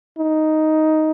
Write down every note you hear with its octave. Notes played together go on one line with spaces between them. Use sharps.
D#4